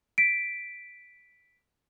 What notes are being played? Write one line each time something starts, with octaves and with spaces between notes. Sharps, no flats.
B6 D7